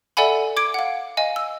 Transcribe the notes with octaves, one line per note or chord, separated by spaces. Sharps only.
A4 D5 E5 F#5 G#5 B5
D6 G#6 D7
F5 F#5
D#5 F5 G#5
E6